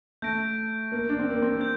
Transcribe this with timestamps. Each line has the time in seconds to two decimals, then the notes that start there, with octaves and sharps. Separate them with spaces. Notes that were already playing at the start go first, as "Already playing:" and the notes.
0.22 A3 G6 A#6 D7
0.92 A#3
1.09 D4
1.19 C4
1.30 A#3
1.42 C4
1.61 G6